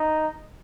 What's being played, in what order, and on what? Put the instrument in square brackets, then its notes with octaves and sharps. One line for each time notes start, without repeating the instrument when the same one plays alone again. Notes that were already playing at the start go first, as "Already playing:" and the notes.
Already playing: [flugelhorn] D#4